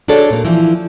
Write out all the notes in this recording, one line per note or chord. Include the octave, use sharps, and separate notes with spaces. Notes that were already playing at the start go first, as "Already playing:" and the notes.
D4 F#4 G#4 A4 C#5 D5
A#2 A#3
E3 F3